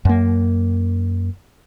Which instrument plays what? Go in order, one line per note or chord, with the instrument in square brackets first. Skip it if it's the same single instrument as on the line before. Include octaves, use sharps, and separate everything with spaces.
[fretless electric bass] F#2 A#3